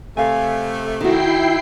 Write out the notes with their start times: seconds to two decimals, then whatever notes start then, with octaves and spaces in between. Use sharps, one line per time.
0.17 C3 A3 A4 F5 G#5
1.01 D#3 E4 F#4 G5 C7